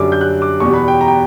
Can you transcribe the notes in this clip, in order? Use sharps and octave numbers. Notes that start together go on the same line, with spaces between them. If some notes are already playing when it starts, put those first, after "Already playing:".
Already playing: F#2 D3 G3 D6
G6
F#6
D6
E2 B2 G3 C#6
B5
G5
A#5
G5